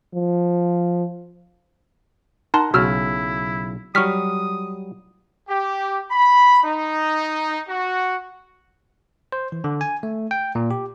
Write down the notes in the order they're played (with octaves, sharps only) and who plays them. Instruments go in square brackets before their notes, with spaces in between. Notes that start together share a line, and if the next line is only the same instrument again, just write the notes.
[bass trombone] F3
[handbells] D#4 A5 C6 [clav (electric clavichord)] A#4 F#5 A#5
[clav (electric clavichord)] B1 C#3 [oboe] E4 [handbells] F#4 E6 F6
[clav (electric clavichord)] F#3 G3 [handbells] C#6 F6 B6 [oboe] D#6
[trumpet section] G4
B5
D#4
F#4
[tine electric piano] C5
E3
D3
G#5
A3
G5
A#2
G4